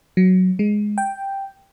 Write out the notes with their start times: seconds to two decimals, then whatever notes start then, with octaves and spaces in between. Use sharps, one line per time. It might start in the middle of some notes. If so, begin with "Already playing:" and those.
0.17 F#3
0.59 G#3
0.98 G5